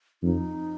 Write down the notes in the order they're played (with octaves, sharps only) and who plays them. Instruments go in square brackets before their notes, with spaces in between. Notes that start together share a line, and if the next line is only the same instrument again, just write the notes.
[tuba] F2 [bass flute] D#4